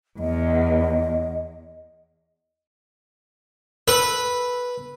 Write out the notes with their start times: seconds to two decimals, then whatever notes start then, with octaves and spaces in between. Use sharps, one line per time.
0.19 E2 D#5
3.88 A4 B4 B5 E6